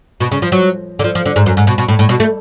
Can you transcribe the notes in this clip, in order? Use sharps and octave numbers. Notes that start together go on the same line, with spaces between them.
B2
C#3
F3
F#3
D3
F3
F3
D3
G#2
F#2
G#2
B2
B2
A2
A2
B2
A3